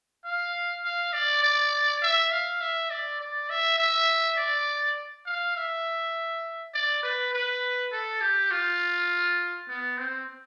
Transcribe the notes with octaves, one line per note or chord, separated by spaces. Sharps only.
F5
F5
D5
D5
E5
F5
E5
D5
D5
E5
E5
D5
F5
E5
D5
B4
B4
A4
G4
F4
B3
C4